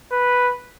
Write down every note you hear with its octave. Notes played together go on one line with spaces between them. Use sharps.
B4